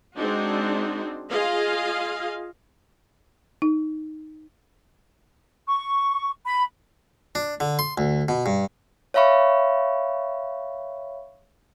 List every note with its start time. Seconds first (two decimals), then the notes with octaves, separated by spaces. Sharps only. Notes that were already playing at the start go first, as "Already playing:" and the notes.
0.15 G#3 C4 D4 D#4 F#4
1.30 F4 G#4 D#5 F5
3.62 D#4
5.67 C#6
6.46 B5
7.35 D4
7.60 D3
7.79 C6
7.98 D2
8.28 B2
8.46 G2
9.14 C#5 E5 F5 B5 C#6